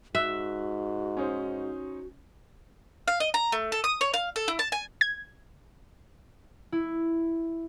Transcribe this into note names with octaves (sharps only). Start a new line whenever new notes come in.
G#2 F#4 E5 F#6
C#4 D#4 C5
F5
D#5
A#5
A3
A4
D#6
C#5
F5
A4
E4
A5
G#5
G#6
E4